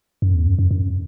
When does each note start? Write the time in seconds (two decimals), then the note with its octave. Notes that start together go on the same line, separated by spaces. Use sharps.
0.22 F#2
0.35 E2
0.47 F#2
0.59 F#2
0.71 F#2